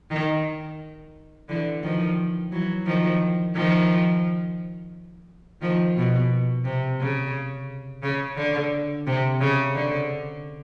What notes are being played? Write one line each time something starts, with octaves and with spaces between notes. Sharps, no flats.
D#3
D3 E3
D#3 F3
E3 F#3
D#3 F3
D#3 F3
D#3 F3
B2
C3
C#3
C#3
D3
C3
C#3
D3